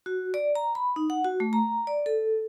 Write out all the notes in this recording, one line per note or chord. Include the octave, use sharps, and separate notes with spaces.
F#4
D5
A#5
B5
D#4
F#5
F#4
A3
A#5
D5
A4